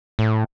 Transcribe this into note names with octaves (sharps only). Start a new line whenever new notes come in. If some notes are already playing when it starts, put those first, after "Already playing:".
A2